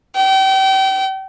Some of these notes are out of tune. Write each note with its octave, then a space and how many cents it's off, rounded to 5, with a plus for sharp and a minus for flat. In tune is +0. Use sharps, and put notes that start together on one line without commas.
G5 -35